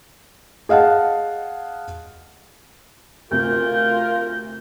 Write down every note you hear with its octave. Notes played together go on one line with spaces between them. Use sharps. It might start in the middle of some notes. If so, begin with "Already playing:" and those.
G#4 D#5 F5 F#5 A5
D2 C3 F4 A#4 G6